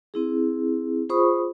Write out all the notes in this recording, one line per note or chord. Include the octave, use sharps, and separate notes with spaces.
C4 E4 G#4
F4 G#4 C5 B5 C#6 D#6